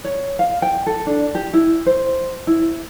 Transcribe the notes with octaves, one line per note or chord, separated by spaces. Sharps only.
C#5
F5
G5
A4
D4
G4
E4
C5
E4